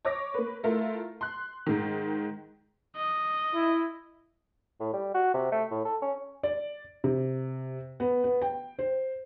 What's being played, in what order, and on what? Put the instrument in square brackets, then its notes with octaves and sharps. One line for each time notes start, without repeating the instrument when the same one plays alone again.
[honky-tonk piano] C#5 D6 A#6
A#3 B4
A3 E4 F4 A#4
C6 F#6
G#2 D#3
[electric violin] D#5
[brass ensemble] E4
[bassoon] A2
G3
F#4
C3
A3
A2
A4
C#4
[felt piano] D5
C3
B3
B3
G5
C5